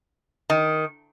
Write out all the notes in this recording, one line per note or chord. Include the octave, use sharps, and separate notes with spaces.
D#3